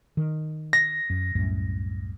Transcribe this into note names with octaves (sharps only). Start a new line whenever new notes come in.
D#3
A#6
F#2
C2 F#2 A2